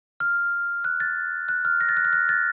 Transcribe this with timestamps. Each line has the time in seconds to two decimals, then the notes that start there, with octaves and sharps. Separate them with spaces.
0.20 F6
0.84 F#6
1.00 A6
1.49 F#6
1.65 F6
1.81 A#6
1.89 A6
1.97 F#6
2.05 F6
2.13 F#6
2.29 A6